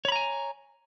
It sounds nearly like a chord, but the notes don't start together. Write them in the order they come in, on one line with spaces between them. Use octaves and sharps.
C#5 B5 A#5 G#5